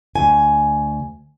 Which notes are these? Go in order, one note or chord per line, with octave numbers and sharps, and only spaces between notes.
D2 G#5